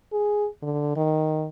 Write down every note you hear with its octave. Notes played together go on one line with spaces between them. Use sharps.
G#4
D3
D#3